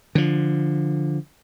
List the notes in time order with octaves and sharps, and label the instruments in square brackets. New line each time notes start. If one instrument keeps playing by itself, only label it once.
[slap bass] D3 F3